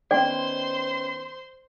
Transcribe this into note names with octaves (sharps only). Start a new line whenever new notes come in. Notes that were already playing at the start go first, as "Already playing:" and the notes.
D#3 B3 C#4 C5 D5 G5 C6